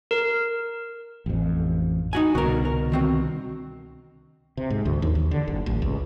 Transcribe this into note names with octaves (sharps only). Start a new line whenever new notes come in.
A#4
A1 F2
D#4 F#4 G#5
C2 B2 D3 F#4 A#4
A#4
D#3 C4 F#4
C3
G#2
D2
D#2
D#2
D3
F#1
A1
C#2